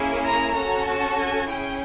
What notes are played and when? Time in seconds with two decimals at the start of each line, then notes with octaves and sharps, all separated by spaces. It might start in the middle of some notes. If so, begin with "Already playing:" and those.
Already playing: A#3 C#4 E4 G#4
0.25 A#5
0.56 C#4 F#4 A4 A#5
0.87 A5
1.19 G#5
1.49 C#4 E4 G#4 G5